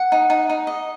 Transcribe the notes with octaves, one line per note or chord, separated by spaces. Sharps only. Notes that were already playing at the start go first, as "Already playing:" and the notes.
Already playing: F#5
D#4
D#4
D#4
D#5